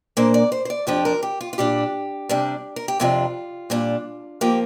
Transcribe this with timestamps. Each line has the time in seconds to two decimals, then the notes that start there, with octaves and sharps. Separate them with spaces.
0.17 A#2 A#3 D4 C5
0.34 D5
0.52 C5
0.65 C5
0.70 D5
0.87 F2 F3 D4 G4
1.05 A#4
1.23 G4
1.41 F4
1.53 F4
1.58 A#2 G3 D4 G4
2.29 C3 G3 D4
2.76 A#4
2.88 G4
3.00 F2 C3 F3 D4 F4
3.70 A#2 G3 D4
4.41 F3 A#3 G4